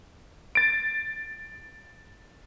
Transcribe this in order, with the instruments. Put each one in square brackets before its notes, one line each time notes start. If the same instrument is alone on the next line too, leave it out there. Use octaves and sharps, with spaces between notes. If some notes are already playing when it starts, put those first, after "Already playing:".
[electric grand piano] A6 D7